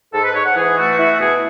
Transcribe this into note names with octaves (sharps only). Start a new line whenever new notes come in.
G#2 A4
B4
G#2 C#5
F#5
E3 G#4
A3 F#4
E4 F#4
B2 G#4